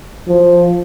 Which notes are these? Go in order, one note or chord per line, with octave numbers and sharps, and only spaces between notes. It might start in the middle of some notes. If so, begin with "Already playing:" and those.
F3